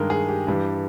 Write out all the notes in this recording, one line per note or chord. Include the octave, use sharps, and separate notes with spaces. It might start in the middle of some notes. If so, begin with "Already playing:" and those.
Already playing: G2 D#3 G#3 A#4
G#4
G4
G2 E3 G3